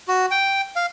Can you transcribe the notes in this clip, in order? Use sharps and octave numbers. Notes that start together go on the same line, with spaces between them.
F#4
G5
F5